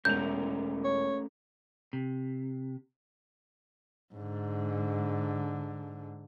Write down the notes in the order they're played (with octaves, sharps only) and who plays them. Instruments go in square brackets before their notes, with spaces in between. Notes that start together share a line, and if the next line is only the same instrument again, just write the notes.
[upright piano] E1 F7 [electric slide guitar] A3 C#4 A#4 [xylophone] G6
[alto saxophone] C#5
[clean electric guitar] C3
[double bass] G#2 D3